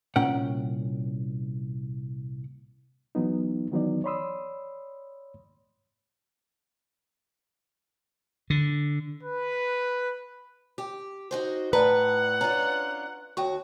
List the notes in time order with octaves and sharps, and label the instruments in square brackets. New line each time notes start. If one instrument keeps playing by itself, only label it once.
[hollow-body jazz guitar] C2 A#2 C#4 F#5 G5
[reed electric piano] E3 F#3 B3 D#4
D#3 E3 F#3 B3 D#4 D5
C#5 D5 B5 C6 D#6 E6
[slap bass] D3
[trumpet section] B4
[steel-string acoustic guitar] G4
D#4 F#4 C5
[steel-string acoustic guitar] A2 [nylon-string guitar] B4 [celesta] D5 A5 A#5 [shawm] F#5
[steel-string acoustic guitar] C#4 D4 F4 [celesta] A#5
[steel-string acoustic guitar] D#2 F#4 [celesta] C#5 G5 C#6